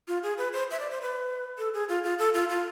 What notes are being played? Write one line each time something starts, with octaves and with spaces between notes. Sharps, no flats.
F4
G#4
B4
C5
E5
D5
C5
B4
A4
G#4
F4
F4
A4
F4
F4